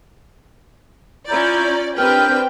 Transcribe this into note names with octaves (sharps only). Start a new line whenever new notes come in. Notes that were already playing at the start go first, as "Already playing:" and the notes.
C#4 E4 F4 D5 A#5 G6
C4 D4 G4 A#4 B4 G5 F6 G6